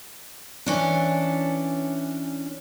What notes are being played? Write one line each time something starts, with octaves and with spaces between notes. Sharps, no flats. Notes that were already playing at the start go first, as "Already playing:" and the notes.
E3 C#4 D4